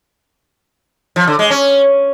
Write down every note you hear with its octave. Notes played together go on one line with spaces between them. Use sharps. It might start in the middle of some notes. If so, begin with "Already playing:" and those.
F3
D3
G#3
C#4